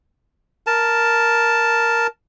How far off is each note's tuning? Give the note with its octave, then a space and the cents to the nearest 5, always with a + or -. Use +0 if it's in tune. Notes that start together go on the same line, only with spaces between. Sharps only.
A#4 +0 A5 +0